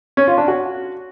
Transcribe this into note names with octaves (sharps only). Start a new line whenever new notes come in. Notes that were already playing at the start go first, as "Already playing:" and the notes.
C#4
F4
D4
F#4